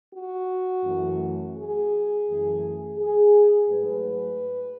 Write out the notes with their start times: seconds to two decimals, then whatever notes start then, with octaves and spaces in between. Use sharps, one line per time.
0.13 F#4
0.84 F#2 E3 A3
1.56 G#4
2.27 F#2 E3 A3
2.97 G#4
3.69 G#2 F#3 A3 B4